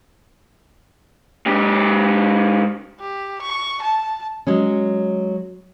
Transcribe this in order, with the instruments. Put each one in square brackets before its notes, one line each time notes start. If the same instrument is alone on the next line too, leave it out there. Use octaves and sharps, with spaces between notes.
[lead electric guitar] G#2 G4
[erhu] G4
C#6
A5
[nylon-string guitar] F#3 G#3 C#4